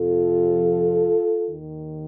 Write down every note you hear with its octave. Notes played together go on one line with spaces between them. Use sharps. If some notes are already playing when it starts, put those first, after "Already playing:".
Already playing: F2 C3 F3 F4 A4
D#2 D#3